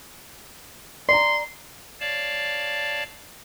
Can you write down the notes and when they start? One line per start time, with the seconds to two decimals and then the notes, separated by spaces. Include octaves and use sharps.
1.09 D5 A#5 C6
2.00 C#5 D5 F5 A5